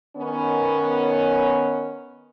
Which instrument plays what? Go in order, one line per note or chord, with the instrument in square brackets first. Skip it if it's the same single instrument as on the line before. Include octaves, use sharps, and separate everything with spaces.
[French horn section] D#3 B3 C#4